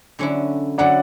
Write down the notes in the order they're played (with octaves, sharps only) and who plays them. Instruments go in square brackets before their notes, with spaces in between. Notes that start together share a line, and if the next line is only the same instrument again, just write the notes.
[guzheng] D3 F#3 C#4 E4
[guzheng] D3 F#3 C#4 E4 [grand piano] D5 F#5